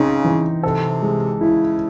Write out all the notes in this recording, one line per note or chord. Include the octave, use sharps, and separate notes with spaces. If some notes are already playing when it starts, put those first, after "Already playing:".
Already playing: C#3 C4 D#4
E3
C3 A4
G#3
C#3 E4